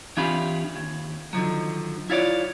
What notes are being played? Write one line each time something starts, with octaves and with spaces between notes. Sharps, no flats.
E3 C4 D4 F4 G4 B5
D#2
D3 D#3 F3 F#3
E4 F4 C#5 D5